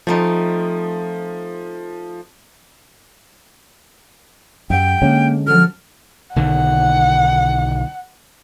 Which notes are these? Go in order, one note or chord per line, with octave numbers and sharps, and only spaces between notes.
F3 A3 C4 D#4
F#2 G4 E5 F#5 G5
D3 G#3 A#3 C#4
F3 F#3 A4 F6
B1 D3 D#3 F#5